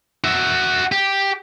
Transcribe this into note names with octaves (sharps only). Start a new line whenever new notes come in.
F#4 E5
G4